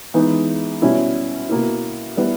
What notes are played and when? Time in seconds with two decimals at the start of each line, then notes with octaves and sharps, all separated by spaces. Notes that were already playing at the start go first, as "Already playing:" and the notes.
0.14 E3 G#3 B3 D#4 G#4
0.82 B2 G3 C#4 E4
1.49 B2 A#3 E4
2.17 G3 B3 E4